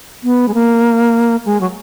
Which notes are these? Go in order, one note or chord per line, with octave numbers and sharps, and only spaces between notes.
B3
G#3
A#3
G#3
F#3